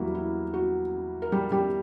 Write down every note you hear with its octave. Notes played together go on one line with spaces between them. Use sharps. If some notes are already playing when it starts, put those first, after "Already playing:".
Already playing: E2 F#3 G3 A#3 E4 F#4
E4
F#4
A#4
G3 G4
G3 G4